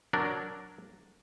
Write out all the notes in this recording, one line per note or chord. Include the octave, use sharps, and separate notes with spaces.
F#3 D4 A#4 D5